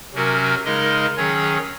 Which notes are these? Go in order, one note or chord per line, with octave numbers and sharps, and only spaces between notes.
C3 F#3 C#4 F#4 A#4
C#3 G#3 D#4 A#4 D#5
D#3 F#3 C#4 G#4 C#5